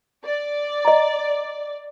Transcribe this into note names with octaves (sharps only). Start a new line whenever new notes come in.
D5
D#5 A#5